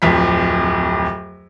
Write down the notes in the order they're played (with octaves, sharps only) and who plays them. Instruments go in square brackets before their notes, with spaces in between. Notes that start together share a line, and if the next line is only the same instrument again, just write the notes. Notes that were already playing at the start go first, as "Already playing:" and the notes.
[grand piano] D1 F2 B6